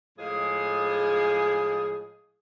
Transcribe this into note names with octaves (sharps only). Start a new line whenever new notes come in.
A2 F3 G#3 G#4